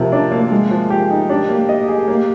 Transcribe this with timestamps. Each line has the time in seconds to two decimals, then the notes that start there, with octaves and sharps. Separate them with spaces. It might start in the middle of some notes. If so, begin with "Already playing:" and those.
Already playing: C3 F3 A#4
0.12 D4
0.32 A#3
0.51 G#3 G#4
0.71 F3
0.90 G4
1.11 D#4
1.30 D4 G4
1.49 A#3
1.69 D#5
1.88 G#4
2.08 A#3